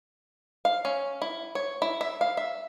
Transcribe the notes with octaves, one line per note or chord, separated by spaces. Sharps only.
F5
C#4
E4
C#5
E4
E5
F5
E5